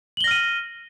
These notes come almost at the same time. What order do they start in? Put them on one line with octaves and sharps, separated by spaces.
F#7 G7 A#6 F6 D#7